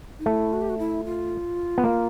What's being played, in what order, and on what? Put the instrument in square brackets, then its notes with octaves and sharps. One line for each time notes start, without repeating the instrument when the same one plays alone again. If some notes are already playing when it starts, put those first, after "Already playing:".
[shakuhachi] D#4
[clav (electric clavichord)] A3 [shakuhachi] E4
[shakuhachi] F#4
G4
F#4
E4
F4
[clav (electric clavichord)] B3
A#3